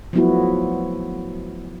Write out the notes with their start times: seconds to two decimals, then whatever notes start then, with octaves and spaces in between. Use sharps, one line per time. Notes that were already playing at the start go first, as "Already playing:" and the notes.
0.13 F3 F#3 A3 B3 E4 F#4